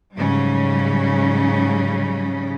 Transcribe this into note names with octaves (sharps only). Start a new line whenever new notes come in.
G#2 C#3 F#3 G3 C#4